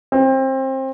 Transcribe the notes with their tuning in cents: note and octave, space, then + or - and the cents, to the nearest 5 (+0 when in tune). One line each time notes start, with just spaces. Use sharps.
C4 +25